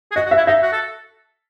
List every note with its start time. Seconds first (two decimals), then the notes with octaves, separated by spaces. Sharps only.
0.11 G#4
0.16 F#4 D#5
0.26 F#4
0.31 E5
0.37 E4
0.47 D#4 E5
0.63 F#4
0.72 A4